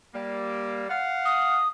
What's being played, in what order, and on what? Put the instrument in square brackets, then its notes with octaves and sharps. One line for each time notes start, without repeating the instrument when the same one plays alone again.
[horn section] G3 A#3
F5 F#5
[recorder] D#6